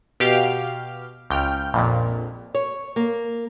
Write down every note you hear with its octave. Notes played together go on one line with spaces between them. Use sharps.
B2 G4 F5 F6
C#2 G5 F6
A#1 F2 A#2
C#5
A#3